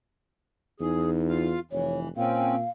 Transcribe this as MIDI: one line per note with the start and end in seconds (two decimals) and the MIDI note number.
0.80 1.56 40
0.80 1.47 63
0.80 1.10 68
1.28 1.59 65
1.28 1.59 77
1.71 2.11 29
1.71 2.08 52
1.71 1.99 73
2.17 2.64 46
2.17 2.56 60
2.17 2.56 61
2.17 2.70 77